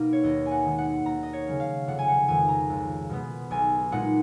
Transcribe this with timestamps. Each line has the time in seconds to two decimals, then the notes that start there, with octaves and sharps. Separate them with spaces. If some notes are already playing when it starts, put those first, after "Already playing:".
Already playing: B2 A#3 D#4
0.13 C#5
0.24 D#2 D#5
0.46 G#5
0.51 F#5
0.65 D#3 G#3 D#4
0.78 F#5
1.05 D#2 A#5
1.23 D#5
1.33 C#5
1.47 C#3 F#3 C#4
1.60 F5
1.87 F1 F#5
1.99 G#5
2.08 F#5
2.28 F2 D#3 G#3 G#5
2.49 A#5
2.70 C#2
3.10 B2 G#3 B3
3.51 B1 G#5
3.92 A#2 G#3 D#4 F#5